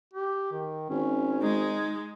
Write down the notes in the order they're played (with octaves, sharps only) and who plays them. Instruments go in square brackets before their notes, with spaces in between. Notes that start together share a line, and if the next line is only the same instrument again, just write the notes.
[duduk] G4
D#3
[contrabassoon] G#1 [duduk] C#4
[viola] G#3 [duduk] D#4